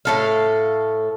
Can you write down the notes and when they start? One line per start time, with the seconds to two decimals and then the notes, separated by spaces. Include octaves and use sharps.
0.05 A2 A4 F5